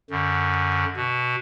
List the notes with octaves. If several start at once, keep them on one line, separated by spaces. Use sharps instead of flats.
F#2 D3
B2